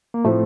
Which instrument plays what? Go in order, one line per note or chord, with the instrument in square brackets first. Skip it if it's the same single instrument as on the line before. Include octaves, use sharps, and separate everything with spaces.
[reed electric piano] A#3
[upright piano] A2 F3 C4 [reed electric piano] A3